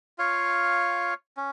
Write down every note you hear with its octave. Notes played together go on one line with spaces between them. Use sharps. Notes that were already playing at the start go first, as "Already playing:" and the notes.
F4 C#5 F5
C#4